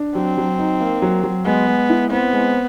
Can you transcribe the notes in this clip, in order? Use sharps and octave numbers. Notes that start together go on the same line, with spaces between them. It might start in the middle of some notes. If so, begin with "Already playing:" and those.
Already playing: D4
F#3 C4
F#3
D#4
A#3
F#3
F#3
G#3 B3
G#3
E4
B3 C4
G#3